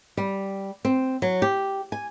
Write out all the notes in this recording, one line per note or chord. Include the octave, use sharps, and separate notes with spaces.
G3
C4
F#3
G4
G#5